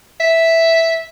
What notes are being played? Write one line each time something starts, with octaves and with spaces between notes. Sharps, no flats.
E5